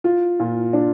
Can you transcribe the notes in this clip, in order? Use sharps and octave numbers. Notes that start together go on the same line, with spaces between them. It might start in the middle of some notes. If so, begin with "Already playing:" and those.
F4
A#2
D4